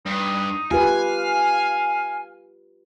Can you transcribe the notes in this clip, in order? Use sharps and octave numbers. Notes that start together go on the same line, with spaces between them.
G2 D#4
F4 G4 B4 F5 G#5